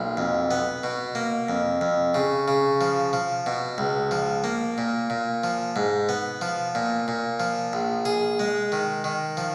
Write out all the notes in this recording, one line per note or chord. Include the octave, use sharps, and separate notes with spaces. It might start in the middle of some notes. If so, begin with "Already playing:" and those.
Already playing: B1 A#2
F2
B3
B2
A#3
F2
F2
C#3
C#3
F3
F3
B2
C#2
F3
A#3
A#2
A#2
F3
G#2
B3
F3
A#2
A#2
F3
A#1
G#4
G#3
D#3
D#3
F3